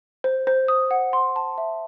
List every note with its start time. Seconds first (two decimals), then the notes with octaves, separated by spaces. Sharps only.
0.24 C5
0.47 C5
0.68 D#6
0.91 F#5
1.13 C6
1.36 A5
1.58 E5